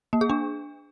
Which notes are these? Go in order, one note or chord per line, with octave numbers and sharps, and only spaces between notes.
A#3
G#4
D4